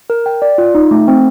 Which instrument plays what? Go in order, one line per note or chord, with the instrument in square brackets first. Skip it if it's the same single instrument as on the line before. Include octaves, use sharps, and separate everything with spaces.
[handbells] A#4
G5
D5
F4
D#4
A3
C4